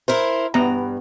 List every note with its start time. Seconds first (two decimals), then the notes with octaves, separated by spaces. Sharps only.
0.08 E4 A#4 C5
0.54 G2 B3 A#5